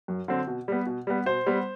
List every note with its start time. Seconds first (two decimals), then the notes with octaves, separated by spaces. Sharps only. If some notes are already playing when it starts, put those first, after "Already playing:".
0.08 F#2
0.28 D3 F#3 C4
0.47 B2
0.68 G3 B3
0.86 B2
1.07 G3 B3
1.26 B2 C5
1.46 G3 B3